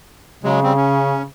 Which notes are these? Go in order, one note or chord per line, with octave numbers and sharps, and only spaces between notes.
C#3 F#3 G#3
G3 C4
C#4